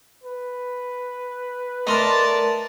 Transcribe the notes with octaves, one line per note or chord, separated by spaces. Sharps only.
B4
A3 A#4 D5 D#5 A5 C6